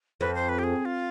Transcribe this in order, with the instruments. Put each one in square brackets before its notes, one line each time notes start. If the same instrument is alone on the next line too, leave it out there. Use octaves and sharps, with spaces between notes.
[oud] F2 [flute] B4
[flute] C5
B4
G4
G#4
F4